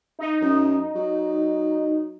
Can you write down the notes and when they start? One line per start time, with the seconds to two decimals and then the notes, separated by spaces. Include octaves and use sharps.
0.19 D#4
0.42 F#2
0.95 F#3